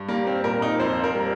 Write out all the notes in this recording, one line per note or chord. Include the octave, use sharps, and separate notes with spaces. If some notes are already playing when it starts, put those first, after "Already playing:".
Already playing: G2
G3 A#3
C4
A#2 A#4
D#4
F2 C5
A#4
G3